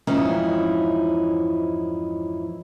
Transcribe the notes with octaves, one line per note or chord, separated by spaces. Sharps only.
F2 G#2 E3 C#4 D#4 E4